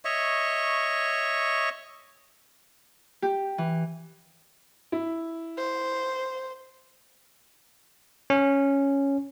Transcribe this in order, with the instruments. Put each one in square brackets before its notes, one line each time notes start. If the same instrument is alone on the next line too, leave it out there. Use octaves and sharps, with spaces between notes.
[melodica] C#5 D#5 E5 C#6
[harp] G4
E3
[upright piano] E4
[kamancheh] C5
[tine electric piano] C#4